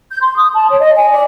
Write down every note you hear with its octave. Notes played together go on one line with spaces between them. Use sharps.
G6
C6
D#6
A5
C#5
D#5
G#5
D5